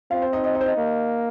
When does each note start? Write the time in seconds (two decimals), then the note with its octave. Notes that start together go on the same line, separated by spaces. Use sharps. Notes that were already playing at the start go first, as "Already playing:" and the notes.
0.11 C4 F4 F5
0.22 C5
0.33 D#4 D#5
0.44 D#4 D#5
0.54 D#4 D#5
0.61 C5
0.66 D#4 D#5
0.77 A#3